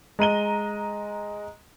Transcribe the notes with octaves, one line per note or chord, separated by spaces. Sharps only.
G#3 A#5 D#7 G7